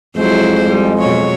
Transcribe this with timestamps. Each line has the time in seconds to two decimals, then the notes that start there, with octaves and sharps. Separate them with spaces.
0.16 F2 F#3 G#3 E4 C5
0.68 G3
1.00 B2 F#3 C#5